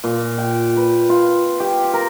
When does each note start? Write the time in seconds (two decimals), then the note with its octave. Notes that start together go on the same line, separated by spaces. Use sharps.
0.04 A#2
0.38 G5
0.77 B4
1.09 F4
1.60 G4
1.93 A#4